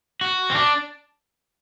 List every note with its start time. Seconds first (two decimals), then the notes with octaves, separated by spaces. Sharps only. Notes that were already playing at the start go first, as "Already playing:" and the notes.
0.21 F#4
0.50 C4
0.55 D4